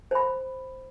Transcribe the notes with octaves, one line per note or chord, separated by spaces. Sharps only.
C5 B5